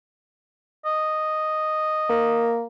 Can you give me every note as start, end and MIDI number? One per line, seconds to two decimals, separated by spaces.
0.85 2.55 75
2.10 2.66 58